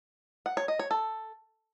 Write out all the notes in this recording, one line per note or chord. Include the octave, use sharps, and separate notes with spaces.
F#5
C#5
D#5
C#5
A4